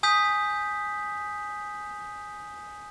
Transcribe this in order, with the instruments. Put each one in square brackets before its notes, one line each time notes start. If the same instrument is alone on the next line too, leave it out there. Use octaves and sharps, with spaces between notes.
[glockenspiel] G#5 D#6 G6 B6